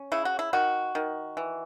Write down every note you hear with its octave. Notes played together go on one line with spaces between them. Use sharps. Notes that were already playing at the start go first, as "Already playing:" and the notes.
Already playing: C#4
C#3 E4
F#4
E4
D#3 F#4
D#3
E3